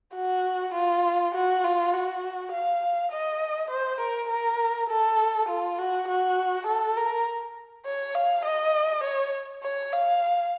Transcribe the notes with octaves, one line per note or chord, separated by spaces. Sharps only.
F#4
F4
F#4
F4
F#4
F5
D#5
C5
A#4
A#4
A4
F4
F#4
F#4
A4
A#4
C#5
F5
D#5
C#5
C#5
F5